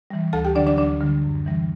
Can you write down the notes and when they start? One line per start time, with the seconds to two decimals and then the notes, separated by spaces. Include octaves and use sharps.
0.10 E3 G3
0.33 D2 A4 A5
0.45 G4 G5
0.55 D3 F#3 D4 D5
0.67 D4 D5
0.77 D2 D4 D5
1.00 D3 G3
1.24 F#2
1.46 E3 G3